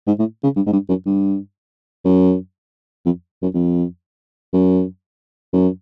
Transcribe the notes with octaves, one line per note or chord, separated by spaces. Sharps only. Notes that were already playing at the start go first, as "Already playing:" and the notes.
G#2
A2
C#3
G2
G#2
G2
F#2
G2
F#2
F2
F#2
F2
F#2
F#2